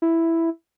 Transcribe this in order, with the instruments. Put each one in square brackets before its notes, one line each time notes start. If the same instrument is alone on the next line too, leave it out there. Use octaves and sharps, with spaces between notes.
[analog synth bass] E4